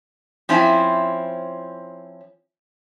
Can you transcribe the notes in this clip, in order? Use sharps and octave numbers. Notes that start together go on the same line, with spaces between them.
F3 C4 C#4 E4